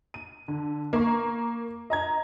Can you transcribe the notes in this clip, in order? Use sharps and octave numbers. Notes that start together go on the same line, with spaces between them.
D#7
D3
A#3 C#6
D#5 A#5 G#6